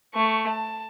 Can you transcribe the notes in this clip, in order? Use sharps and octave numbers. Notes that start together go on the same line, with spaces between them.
A3 C#6
A5